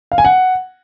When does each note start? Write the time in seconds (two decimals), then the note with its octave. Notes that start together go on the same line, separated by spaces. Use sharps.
0.12 F5
0.18 G#5
0.25 F#5